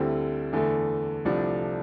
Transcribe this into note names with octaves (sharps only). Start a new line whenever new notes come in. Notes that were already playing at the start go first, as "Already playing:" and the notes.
Already playing: D2 D3 G3 C4 E4
E2 D3 A3
C2 C3 F3 A3 D4